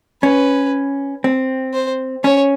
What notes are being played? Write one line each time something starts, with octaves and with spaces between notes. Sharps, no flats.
C#4 B4
C4
C5
C#4 C#5